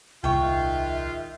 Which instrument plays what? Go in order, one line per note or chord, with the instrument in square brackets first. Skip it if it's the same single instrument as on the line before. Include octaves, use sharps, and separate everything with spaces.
[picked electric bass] D#1 C2 [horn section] G#2 D#3 F4 [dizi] E5 [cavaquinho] G5 C#6